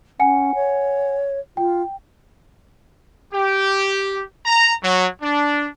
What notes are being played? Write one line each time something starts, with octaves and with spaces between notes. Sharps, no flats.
C#4 F#5 G#5 C#7
C#5
F4 G5
G4
A#5
F#3
D4